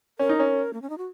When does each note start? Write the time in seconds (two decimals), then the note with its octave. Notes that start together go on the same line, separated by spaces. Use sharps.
0.19 C#4 A#4
0.29 D#4
0.39 C#4
0.73 A#3
0.82 C#4
0.90 D#4
0.98 F#4